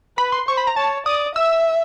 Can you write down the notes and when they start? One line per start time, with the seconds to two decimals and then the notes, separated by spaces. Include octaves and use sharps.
0.18 B4 B5
0.32 C6
0.48 C5 C#6
0.57 B5
0.67 A#5
0.76 C#5 A5
1.06 D5 D#6
1.35 E5 E6